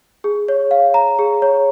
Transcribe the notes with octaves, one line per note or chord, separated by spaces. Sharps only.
G#4
C#5
F5
A#5
G#4
C#5